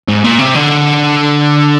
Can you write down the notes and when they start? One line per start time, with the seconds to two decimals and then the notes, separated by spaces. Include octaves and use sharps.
0.08 G#2
0.24 A#2
0.39 C3
0.54 D3